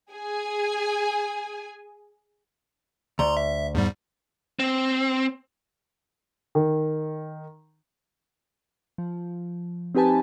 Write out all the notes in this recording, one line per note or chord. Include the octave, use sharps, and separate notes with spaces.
G#4 G#5
D2 A#5 C6
E5
E2 G#2 G3
C4
D#3
F3
C4 D#4 G4 B4 G#5 A5